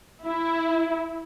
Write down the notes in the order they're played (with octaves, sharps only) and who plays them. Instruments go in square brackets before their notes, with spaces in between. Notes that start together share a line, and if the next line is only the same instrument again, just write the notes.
[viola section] E4